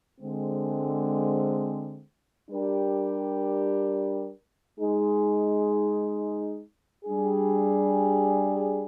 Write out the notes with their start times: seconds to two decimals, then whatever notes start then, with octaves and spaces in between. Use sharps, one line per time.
0.21 D3 G#3 C4
2.49 G3 D4 G4 A#4
4.78 G#3 D#4 G#4
7.05 G3 D4 G#4